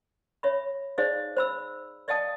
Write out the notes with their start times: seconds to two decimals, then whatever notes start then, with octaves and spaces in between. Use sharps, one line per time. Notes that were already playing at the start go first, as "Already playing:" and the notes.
0.43 C#5 E5 B5
0.98 D#4 G#4 C5 D5 D#5 F5
1.37 C5 B5 E6
2.08 D5 D#5 F5 G5 A5 D#6